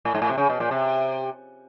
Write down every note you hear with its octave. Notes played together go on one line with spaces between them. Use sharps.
A2
G#2
A2
C3
C#3
B2
A#2
C3